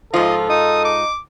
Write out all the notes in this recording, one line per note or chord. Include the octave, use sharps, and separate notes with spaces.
G#2 F3 F4 A4 D#5
D#4 D#6
D6